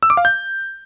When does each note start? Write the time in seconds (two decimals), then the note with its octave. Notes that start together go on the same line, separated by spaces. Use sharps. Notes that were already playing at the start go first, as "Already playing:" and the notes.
0.03 E6
0.10 D6
0.17 F5
0.25 G6